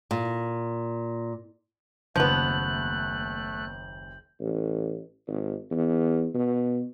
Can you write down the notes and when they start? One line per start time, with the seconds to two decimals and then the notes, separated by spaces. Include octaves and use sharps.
0.11 A#2
2.16 F#1 D#2 F3 A3 B3 F#6 G6 F#7
4.40 A1
5.27 G#1
5.71 E2
6.34 B2